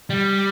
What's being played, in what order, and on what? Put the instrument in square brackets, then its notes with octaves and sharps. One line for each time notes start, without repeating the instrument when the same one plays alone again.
[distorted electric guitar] G3